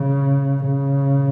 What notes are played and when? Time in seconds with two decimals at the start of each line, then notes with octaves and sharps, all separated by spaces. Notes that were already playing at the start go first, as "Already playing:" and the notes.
Already playing: C#3
0.66 C#3